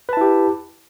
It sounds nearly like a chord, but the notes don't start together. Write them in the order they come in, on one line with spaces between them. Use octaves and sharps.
B4 A5 E4 G4